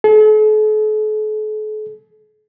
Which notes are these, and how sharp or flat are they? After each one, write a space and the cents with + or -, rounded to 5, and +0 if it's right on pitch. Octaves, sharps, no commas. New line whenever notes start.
A4 -45